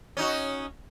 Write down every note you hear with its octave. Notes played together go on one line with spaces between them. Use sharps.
C#4 D#4 F#4